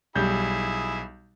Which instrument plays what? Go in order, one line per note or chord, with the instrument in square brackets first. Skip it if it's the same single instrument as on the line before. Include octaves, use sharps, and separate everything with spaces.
[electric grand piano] B1 [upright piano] G3 G6 [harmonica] E4 G#4